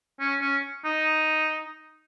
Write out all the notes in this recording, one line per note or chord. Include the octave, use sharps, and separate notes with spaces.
C#4
C#4
D#4